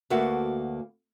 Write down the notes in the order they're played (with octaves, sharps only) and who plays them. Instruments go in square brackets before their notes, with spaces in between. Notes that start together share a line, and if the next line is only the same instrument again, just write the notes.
[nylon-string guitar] D2 A#3 B3 F#4 A4